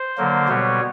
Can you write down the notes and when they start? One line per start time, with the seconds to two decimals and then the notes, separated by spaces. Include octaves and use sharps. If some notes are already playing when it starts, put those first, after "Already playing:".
Already playing: C5
0.17 D3 F#3 A#3
0.48 B2 G3 B3 C#5